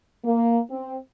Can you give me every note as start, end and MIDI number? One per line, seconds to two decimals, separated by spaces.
0.24 0.59 58
0.70 0.96 60